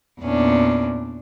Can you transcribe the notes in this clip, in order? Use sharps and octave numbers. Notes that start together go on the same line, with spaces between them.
E2 A#2 C#4 D4